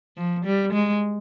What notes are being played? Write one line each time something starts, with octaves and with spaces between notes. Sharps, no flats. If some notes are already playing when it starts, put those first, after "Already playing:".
F3
G3
G#3